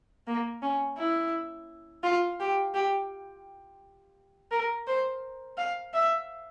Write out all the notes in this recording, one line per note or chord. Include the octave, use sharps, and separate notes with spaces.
A#3
C#4
E4
F4
G4
G4
A#4
C5
F5
E5